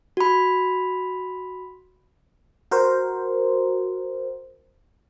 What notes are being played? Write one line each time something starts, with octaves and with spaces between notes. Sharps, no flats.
F#4 B5
F#4 A#4 C5